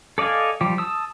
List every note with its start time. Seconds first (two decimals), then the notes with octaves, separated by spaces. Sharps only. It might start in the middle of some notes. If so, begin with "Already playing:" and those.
0.18 A4 D5 D#5 F5 G#5
0.61 F3 G3 G4
0.78 A5 D#6 E6